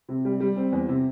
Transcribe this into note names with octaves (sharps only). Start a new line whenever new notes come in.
C3
G3
G3
C4
E2
C3